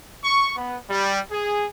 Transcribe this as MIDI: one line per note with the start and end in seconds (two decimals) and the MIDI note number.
0.23 0.53 85
0.57 0.77 59
0.90 1.19 55
1.31 1.65 68